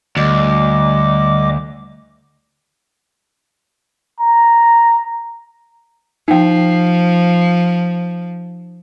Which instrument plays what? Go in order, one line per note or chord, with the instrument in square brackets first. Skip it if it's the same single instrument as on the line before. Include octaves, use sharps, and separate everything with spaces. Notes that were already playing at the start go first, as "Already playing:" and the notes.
[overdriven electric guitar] D2 [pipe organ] G3 D#5 D6
[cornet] A#5
[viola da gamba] F3 [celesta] D#4 G5